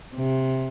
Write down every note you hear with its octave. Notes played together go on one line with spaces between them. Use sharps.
C3